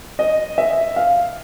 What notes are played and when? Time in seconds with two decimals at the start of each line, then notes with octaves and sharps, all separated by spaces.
0.19 D#5
0.58 E5
0.96 F5